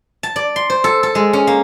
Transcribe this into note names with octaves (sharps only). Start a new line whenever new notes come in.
A5
D5
C6
C5
A4
A4
G#3
C#4
A#3